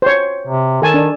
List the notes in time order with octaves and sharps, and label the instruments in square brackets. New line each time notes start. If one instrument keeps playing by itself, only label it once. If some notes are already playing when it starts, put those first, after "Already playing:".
[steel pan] C5 C#5
[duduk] C3
[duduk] D#3 [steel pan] A4 G#5 A5
[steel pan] D4